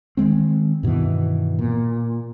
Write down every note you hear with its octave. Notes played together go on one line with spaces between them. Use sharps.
D#3 F#3 G#3 C4
G2 B2 D#3 E3
A#2